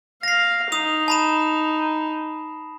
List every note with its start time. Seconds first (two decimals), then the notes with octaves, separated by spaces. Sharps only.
0.23 F5 A#6 C7
0.72 D#4 D#6 F7
1.08 A5 B5 E7